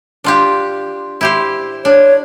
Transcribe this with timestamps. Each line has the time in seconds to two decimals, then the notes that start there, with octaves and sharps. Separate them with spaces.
0.24 D4 F4 G4
1.21 E4 G4 C5
1.85 D4 C#5